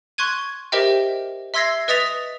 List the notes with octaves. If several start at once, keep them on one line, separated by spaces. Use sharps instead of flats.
C6 C#6 F#6 G#6 D#7
G4 A#4 C5 D#5 E5 G5
E5 C6 E6 G#6 A#6 C7
B4 D#5 D#6 A6 B6 F7